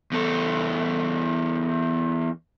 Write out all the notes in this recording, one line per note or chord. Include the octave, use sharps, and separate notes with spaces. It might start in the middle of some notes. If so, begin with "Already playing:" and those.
E2 A4